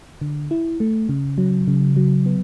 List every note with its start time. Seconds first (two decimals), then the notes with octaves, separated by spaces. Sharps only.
0.21 D3
0.51 E4
0.80 A3
1.09 C#3
1.38 F#3
1.68 C#3
1.96 F#3
2.26 B3